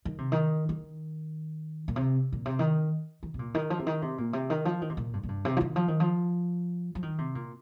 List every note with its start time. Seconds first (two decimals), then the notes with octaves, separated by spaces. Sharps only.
0.05 D#3
0.18 C3
0.32 D#3
0.69 D#3
1.88 A#2
1.96 C3
2.32 A#2
2.45 C3
2.59 D#3
3.23 D#3
3.34 C3
3.39 A#2
3.55 D#3
3.70 F3
3.79 C3
3.87 D#3
4.02 C3
4.18 A#2
4.33 C3
4.50 D#3
4.65 F3
4.81 D#3
4.90 C3
4.97 A#2
5.13 G2
5.23 A#2
5.28 G2
5.45 C3
5.57 F3
5.61 D#3
5.76 F3
5.88 D#3
6.00 F3
6.95 F3
7.02 D#3
7.18 C3
7.35 A#2